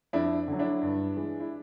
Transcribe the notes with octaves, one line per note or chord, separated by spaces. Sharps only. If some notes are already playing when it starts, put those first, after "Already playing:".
F2 D4 E4
D3 F#3
D4 E4
G2
E3 G#3
E4